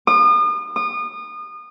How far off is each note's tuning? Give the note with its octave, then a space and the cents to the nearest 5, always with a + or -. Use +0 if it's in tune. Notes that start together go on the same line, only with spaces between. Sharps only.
D#6 -40
D#6 -30